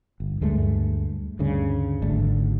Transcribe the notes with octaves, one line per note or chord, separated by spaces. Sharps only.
G1
D2 G2 G#3 A3
D2 G2 C#3
G#1 D3 A3